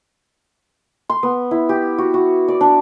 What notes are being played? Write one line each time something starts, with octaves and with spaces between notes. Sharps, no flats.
C6
B3
E4
G4
F#4
F#4
D5
D4